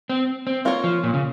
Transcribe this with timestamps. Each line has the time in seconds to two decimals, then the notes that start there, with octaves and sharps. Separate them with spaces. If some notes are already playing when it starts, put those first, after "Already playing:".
0.10 C4
0.47 C4
0.65 A#3 F4 A#4 C#5
0.84 F3
1.04 A#2
1.14 C#3